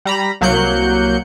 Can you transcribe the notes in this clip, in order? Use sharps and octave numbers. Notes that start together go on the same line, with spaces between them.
G3 A#5 B5
C2 F#3 A#3 F#6 G6 C#7